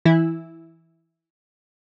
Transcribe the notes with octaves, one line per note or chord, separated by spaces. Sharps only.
E3 E4